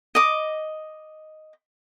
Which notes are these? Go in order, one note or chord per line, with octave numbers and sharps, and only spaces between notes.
D#5 D6